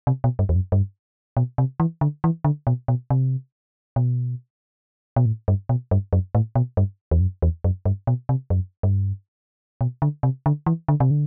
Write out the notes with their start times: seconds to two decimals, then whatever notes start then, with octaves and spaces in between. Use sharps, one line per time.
0.07 C3
0.24 B2
0.39 G2
0.49 E2
0.55 F#2
0.72 G2
1.37 B2
1.58 C3
1.80 E3
2.01 D3
2.24 E3
2.44 D3
2.67 B2
2.88 B2
3.10 C3
3.96 B2
5.16 B2
5.26 A2
5.48 G2
5.69 B2
5.91 G2
6.13 F#2
6.35 A2
6.55 B2
6.77 G2
7.11 E2
7.20 F#2
7.42 E2
7.64 F#2
7.86 G2
8.07 B2
8.29 C3
8.50 F#2
8.83 G2
9.81 B2
10.02 D3
10.23 C3
10.46 D3
10.66 E3
10.88 D3
11.00 C3
11.11 D3